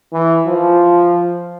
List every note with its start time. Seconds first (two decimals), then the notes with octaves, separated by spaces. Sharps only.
0.13 E3
0.47 F3